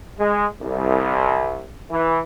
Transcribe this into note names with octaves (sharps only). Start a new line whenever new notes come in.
G#3
C2
E3